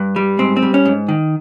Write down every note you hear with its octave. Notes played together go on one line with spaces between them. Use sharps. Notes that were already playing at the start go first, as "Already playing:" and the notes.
Already playing: G2
G3
G#2 C4
C4
G3
C#4
G#2
D#3